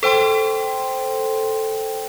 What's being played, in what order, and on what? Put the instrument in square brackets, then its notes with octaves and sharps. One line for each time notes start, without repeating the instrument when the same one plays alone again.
[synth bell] A4 C5 G5 C6